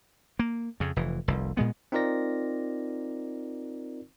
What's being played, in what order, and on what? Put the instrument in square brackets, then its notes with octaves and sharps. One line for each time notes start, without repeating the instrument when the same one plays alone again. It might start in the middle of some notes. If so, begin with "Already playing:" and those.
[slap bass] A#3
F2 C#3
F1 E3
F1 C2
A#2 G#3 B3
[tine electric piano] C4 D#4 F4 A#4 D5 A#6